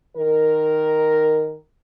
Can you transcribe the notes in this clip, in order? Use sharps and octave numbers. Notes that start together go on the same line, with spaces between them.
D#3 A#4